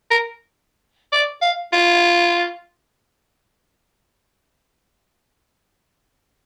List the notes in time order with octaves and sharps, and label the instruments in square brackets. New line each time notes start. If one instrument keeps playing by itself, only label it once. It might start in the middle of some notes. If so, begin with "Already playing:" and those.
[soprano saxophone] A#4
D5
F5
F4